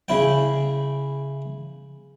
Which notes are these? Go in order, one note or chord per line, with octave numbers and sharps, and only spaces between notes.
C#3 E4 G5